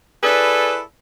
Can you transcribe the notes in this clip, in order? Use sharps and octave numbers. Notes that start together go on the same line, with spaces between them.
E4 G#4 A4 B4 D5